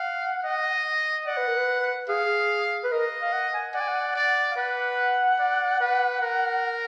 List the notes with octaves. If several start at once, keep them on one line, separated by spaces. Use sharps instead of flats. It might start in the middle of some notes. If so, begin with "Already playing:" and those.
Already playing: F5 F#5
D#5
D5 F#5
B4
A#4
B4
G#4 F5
B4
A#4 D#5
F5
F#5
G#5
D5 F#5
G#5
F#5
D5
F5
B4 F#5
D5
B4
A#4